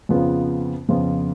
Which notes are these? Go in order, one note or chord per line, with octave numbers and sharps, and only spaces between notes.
F2 C#3 F3 B3 F4
F2 C#3 F3 B3 F4